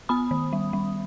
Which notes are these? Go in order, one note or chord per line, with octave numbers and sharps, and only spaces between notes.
B3 B5 D#6
D#3
G3
G3